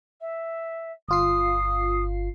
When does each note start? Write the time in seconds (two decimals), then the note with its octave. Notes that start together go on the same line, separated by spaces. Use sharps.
0.21 E5
1.09 G1 F4 D#6 C7